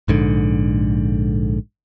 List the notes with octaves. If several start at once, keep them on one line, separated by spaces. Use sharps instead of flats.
A#1 G#2 D3